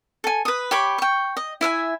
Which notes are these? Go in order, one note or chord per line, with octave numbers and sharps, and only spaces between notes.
A4 G#5
B4 D#6
G4 C#5 B5 D6
G5 C#6
D#5
E4 E5 F5 G#5